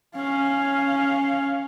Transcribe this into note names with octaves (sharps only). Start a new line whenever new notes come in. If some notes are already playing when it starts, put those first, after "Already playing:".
C#4 F5